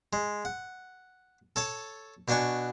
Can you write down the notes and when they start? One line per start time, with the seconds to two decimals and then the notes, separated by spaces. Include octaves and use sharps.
0.13 G#3
0.45 F#5
1.56 A4 C#5 A5
2.28 B2 B3 D4 F#5 G#5 C#6